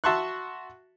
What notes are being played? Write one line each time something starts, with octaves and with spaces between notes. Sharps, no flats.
F#4 E5 A5 C6 C#6 F#6